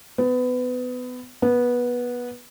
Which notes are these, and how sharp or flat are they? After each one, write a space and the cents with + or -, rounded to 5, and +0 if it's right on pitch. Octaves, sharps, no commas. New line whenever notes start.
B3 +25
B3 -15